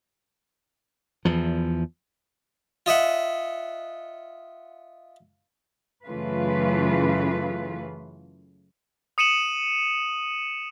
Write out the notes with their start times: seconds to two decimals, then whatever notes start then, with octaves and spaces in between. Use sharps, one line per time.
1.25 E2 F3
2.86 F4 D#5 E5 F#5
6.06 F#2 C#3 E3 A3 F4 B4
9.18 D#6 C#7 D#7 E7 F#7